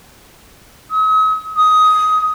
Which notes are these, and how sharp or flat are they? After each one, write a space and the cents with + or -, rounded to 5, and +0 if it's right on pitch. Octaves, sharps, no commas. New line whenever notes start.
D#6 +45
D#6 +15